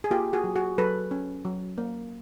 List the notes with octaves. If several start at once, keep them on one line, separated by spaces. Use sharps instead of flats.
G#4
A#3 F4 G4
F#4 G#4
F#3
F#4 G#4
F#3 A4 B4
C#4
F#3
A#3